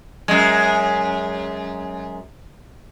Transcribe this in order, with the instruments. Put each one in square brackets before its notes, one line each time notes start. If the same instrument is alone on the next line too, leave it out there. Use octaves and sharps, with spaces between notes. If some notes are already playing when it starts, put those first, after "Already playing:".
[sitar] F#2 G#3